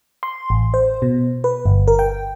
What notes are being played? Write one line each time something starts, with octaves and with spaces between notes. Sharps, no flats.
C6
A1
C5
B2
B4
G1
A#4
G5